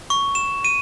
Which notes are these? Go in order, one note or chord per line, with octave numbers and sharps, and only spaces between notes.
C#6
E7
D#7